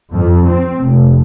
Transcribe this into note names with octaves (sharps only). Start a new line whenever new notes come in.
F2
C4
F1